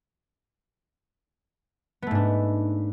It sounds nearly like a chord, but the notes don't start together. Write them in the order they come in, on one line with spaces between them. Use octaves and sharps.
B3 A3 G#2 D4